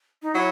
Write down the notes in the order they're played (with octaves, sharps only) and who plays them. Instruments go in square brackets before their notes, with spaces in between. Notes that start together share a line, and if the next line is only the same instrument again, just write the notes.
[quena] D#4
[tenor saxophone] F#3 [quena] E4